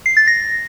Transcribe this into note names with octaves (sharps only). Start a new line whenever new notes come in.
C7
A6
A#6